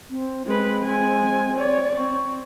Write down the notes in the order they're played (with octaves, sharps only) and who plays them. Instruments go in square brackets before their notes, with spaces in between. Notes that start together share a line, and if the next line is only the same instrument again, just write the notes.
[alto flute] C4
[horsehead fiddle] G#3 B4 [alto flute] C4
[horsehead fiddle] G#3 G#5
C#5 D5
[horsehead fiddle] C4 [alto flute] C#6